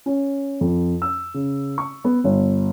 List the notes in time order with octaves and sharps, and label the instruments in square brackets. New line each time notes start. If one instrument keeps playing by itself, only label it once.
[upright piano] C#4
F2
E6
C#3
C#6
B3
G1